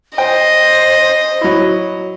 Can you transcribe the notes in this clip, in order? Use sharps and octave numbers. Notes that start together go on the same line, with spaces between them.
C5 D#5 G5
F#3 E4